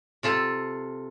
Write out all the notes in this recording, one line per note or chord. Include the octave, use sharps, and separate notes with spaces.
C3 F4 A4